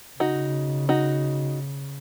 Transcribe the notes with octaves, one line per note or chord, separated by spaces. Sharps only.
C#3 D#4 F#4
D#4 F#4